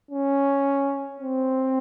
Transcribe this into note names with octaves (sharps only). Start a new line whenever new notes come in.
C#4
C4